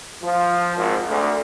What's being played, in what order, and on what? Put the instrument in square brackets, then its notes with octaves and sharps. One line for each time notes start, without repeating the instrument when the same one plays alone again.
[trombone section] F3
G#1
D2